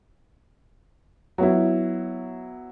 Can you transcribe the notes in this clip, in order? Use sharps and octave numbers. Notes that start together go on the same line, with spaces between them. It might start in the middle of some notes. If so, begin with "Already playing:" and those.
F#3 B3 E4